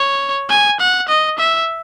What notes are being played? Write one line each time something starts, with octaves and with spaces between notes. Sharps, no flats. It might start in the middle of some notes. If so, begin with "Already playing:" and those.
Already playing: C#5
G#5
F#5
D#5
E5